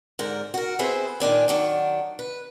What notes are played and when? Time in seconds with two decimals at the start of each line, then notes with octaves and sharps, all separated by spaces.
0.19 G#2 D3 A#4
0.54 F#4 A#4
0.79 B3 C4 E4 G#4 B4 C5
1.20 A#2 D#3 D4 G#5
1.48 D#3 F#3 D4
2.19 B4